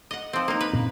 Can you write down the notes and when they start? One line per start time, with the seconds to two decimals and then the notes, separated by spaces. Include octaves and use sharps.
0.11 D#5 F#5
0.33 F3 C4
0.48 A#3 D#4
0.61 B4
0.73 A#2 C4